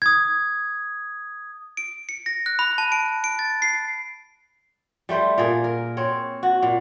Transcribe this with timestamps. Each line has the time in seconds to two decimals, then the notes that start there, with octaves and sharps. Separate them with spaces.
0.02 D#6 G#6
1.77 D7
2.09 C#7
2.26 A#6
2.46 F#6
2.59 B5
2.78 A5
2.92 D7
3.24 D7
3.39 A6
3.62 C7
5.09 G3 A3 C5 G5
5.38 A#2 A#3 G#4
5.64 A#4
5.97 C4 C#5
6.43 F#4
6.62 A#2